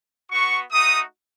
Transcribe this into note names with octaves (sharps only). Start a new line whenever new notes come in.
B3 F#4 C#6
A3 D#4 F#4 D#6